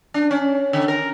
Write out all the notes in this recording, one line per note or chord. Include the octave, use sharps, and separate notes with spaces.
D4
C#4
D3
A#4